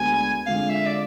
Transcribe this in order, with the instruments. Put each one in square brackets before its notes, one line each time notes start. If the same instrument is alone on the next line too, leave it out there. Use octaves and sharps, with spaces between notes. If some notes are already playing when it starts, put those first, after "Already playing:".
Already playing: [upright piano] D2 D3 G#3 B3 [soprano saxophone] G#5
[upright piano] D3 G#3 C4 F4 [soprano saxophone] F5
[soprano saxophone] E5
D5